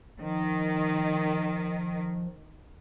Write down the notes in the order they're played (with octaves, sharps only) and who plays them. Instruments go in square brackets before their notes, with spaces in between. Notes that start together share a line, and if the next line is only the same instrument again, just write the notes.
[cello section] D#3 [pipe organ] F3